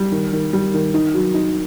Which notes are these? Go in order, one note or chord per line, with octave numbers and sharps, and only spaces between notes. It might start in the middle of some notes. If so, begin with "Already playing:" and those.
Already playing: G3
D#3
D#3
G3
D#3
D#4
F#3
D#4